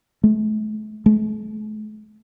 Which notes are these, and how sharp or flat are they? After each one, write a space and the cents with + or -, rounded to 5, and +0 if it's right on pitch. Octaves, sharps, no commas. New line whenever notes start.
A3 -40
A3 -45